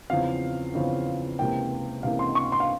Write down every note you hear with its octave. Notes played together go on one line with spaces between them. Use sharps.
E2 C#3 F3 C4 F5
E2 C#3 F3 C4
C#2 C3 E3 A#3 G5
C#2 C3 E3 A#3 F5
C6
C#6
C6
F5